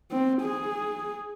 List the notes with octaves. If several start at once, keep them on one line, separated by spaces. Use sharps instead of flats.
C4
G#4